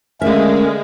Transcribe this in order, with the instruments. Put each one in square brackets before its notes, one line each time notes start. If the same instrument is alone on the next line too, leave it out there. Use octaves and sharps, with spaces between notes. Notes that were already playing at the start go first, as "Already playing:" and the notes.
[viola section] D3 G#3 [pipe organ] A3 C#4 A#4 [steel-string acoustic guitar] E5 F5